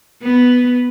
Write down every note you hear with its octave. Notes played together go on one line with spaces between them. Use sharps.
B3